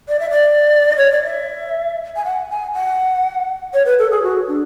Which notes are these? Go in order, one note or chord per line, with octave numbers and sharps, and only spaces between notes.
D5
E5
D5
C#5
D5
E5
G#5
F#5
G#5
F#5
C#5
B4
A4
G#4
F#4
D4